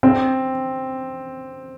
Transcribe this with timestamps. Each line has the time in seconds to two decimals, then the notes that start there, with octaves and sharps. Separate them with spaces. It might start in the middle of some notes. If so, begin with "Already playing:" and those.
0.03 C4